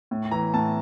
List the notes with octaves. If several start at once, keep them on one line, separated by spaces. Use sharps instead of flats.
A2
E3 A#5
A2 A5